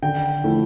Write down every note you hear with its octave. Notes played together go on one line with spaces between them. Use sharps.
D3 G5
F3 A3 E4